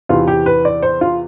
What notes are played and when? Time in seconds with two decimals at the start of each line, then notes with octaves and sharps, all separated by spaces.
0.09 E2 C3 E3 F4
0.28 G4
0.46 B4
0.65 D5
0.83 C5
1.01 F4